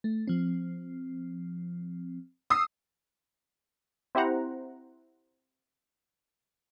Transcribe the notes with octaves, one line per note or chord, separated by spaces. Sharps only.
A3
F3 C4
D#6 E6 C7
C4 E4 G4 C5 F#5 A#5